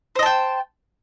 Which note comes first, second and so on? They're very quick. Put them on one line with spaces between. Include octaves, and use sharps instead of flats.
C5 D#5 A5 G5